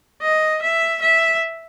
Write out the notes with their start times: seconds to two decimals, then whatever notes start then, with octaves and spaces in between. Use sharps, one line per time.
0.22 D#5
0.62 E5
1.02 E5